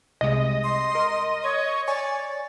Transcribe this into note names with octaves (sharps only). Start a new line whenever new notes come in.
C2 C3 G#3 D#5
C6
A#4
C#5
C#5 D5 G#5 C#6